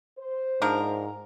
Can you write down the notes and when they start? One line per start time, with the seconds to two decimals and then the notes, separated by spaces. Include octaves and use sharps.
0.18 C5
0.62 G#2 F3 D4 A#4